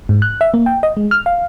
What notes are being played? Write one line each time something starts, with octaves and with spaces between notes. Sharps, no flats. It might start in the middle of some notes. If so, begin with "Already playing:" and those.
G#2
F#6
E5
A#3
G5
D#5
G#3
F6
F5